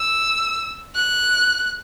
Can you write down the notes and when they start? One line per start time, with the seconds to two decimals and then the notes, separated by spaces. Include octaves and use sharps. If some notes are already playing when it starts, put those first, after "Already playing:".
Already playing: E6
0.95 F#6